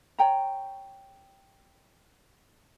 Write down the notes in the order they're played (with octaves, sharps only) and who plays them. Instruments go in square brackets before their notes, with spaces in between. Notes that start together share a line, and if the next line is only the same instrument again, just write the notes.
[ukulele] C#5 G5 A#5